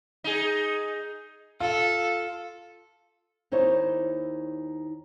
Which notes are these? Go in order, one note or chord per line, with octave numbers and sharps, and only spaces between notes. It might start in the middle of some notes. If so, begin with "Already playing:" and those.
D#4 G#4
F4 A4
D#2 D#4 E4 C5 C#5